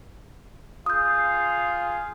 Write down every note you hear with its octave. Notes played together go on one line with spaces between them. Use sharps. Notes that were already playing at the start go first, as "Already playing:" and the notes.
F4 G#4 F5 D#6 G6